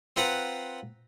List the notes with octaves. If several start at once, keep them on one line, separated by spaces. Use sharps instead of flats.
C4 F4 B4 F#5 A#5